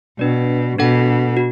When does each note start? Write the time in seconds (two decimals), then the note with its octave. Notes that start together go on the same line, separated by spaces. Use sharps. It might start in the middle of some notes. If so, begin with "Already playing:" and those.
0.19 B2 D4 B4 D5
0.78 B2 D4 A4 F#5
1.37 F#4